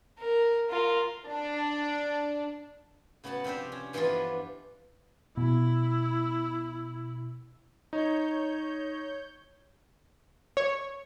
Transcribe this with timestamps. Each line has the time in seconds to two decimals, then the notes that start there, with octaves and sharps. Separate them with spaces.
0.19 A#4
0.70 F4 A#4
1.32 D4
3.24 C#3 B3 F#4 F#5 A5
3.44 C3 F3 C4 D4 G4
3.72 C#4
3.93 G2 E3 F3 B3 D4 F4
5.37 B2 E4
7.93 D#4 C#5 G6
10.57 C#5